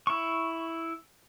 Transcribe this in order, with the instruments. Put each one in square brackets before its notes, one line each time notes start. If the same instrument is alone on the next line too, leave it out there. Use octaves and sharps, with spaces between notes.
[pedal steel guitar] E4 C#6